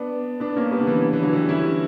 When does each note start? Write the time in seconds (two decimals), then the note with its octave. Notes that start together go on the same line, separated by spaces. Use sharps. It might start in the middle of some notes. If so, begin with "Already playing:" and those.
Already playing: B3 D4
0.40 B3 D4
0.56 A#3 C#4
0.71 G3 B3
0.79 D3
0.87 E3
1.02 D3
1.13 E3
1.23 D3 F#3
1.33 E3 G3
1.49 C#4 E4